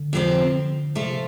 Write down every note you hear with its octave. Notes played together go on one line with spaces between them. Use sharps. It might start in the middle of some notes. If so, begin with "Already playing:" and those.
Already playing: D3
F2 C3 F3 C4
C3 F3 A3 F4